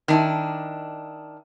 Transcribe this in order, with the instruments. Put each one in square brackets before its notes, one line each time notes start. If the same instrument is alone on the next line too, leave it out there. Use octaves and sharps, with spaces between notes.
[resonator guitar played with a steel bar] D#3 D4 E4